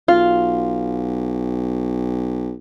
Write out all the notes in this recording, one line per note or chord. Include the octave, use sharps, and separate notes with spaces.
B1 F4